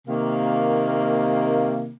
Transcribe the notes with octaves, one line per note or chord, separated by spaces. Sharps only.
C3 D#3 A#3